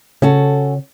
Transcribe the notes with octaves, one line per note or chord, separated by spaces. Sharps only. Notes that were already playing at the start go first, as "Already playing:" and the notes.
C#3 C#4 F#4 A4